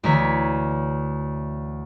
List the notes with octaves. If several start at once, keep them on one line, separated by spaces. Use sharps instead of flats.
D2 D3 E3 C#5 A#5 B6